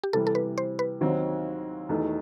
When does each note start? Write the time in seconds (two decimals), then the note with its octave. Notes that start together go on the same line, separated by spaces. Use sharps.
0.04 G4
0.13 C3 E3 G3 A4
0.27 A4
0.35 B4
0.58 C5
0.79 B4
1.01 D#2 D#3 F#3 C4
1.89 E1 E2 D#3 A3